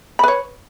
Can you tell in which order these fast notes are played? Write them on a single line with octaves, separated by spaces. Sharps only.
B5 B4 C#5